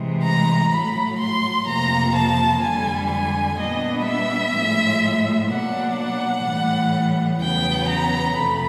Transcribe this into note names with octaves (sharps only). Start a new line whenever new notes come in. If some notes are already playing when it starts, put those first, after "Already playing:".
Already playing: C3 E3 G#3
A#5
A2 F#3 A3 B5
C6
F2 C3 F3 A#3 A#5
A5
F2 D3 G3 G#5
G#5
A#2 G3 B3 D4 D#5
E5
A2 F3 G#3
B2 F#3 A#3 D4 F#5
F#5
A2 E3 G3
E2 C#3 F#3 B3 G5
A#5
F2 C3 F3 A3 B5